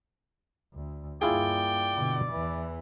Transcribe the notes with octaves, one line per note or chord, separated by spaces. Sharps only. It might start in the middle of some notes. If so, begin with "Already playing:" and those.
D2
G2 A#3 E4 F4 G#4 D5 G5
B2 D3
E2 E3